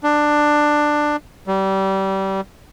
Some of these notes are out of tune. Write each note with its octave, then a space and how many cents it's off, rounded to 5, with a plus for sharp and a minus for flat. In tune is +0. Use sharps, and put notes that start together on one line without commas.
D4 +15
G3 -25